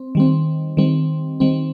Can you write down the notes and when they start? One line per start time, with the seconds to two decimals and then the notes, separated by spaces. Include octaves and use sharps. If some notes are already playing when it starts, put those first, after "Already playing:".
Already playing: C4
0.15 D#3 G3 C4
0.77 D#3 G3 C4
1.40 D#3 G3 C4